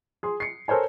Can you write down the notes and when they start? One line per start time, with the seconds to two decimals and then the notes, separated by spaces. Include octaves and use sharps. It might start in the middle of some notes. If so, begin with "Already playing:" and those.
0.23 G#4 C6
0.40 C7 C#7
0.68 A4 A#4 C5 C#5 G#5